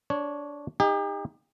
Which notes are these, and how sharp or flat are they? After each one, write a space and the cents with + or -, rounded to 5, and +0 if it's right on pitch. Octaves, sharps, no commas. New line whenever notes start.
D4 -15 C#5 +0
D#4 +0 G4 +40